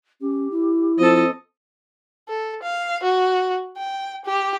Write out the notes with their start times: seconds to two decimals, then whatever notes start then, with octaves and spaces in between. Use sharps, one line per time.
0.21 C#4 G4
0.51 E4
0.98 F3 C4 A4 D#5
2.28 A4
2.62 F5
3.03 F#4
3.76 G5
4.25 G4